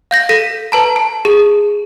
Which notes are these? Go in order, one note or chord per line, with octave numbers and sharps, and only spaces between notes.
F5 G6 A#6
A4 A#6 B6 D#7
B4 A5 A#5
A5
G#4